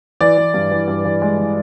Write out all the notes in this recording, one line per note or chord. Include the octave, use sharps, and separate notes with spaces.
E3 D5
E3
G2
E3
G2
E3
G#3
E3